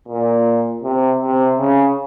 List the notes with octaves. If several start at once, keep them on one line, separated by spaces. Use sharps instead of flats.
A#2
C3
C3
C#3